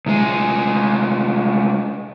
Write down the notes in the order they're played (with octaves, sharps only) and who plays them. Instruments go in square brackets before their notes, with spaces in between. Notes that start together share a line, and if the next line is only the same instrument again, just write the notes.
[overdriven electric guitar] C2 G#3